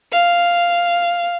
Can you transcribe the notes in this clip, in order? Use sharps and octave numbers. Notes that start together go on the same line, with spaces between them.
F5